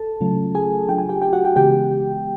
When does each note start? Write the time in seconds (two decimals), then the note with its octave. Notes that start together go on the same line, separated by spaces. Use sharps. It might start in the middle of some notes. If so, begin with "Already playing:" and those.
Already playing: A4 A5
0.21 C#3 F#3 A3 C#4 F4
0.55 G#4 G#5
0.89 F#3 A3 D4 F4 G5
0.98 G#5
1.09 G4 G5
1.22 G4 G5
1.33 F#4 F#5
1.45 G4 G5
1.55 C#3 E3 G#3 B3 G4 G5